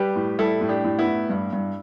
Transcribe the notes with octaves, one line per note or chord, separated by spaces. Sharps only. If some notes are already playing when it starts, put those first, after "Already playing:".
Already playing: G3 G4 B4
A2
G3 E4 A4
A2
D4 G4
A2
B3 E4
A2
G2
G2